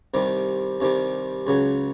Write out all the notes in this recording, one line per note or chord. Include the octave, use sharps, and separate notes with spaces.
C2 C3 D#3 G3
C2 C3 D#3 G3
C#2 C#3 F#3